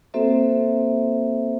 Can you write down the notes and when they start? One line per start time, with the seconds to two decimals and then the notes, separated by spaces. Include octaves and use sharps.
0.14 A#3 C4 F#4 A4 C5 E5